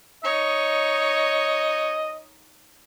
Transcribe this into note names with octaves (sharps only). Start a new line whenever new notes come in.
D#4 C#5 D#5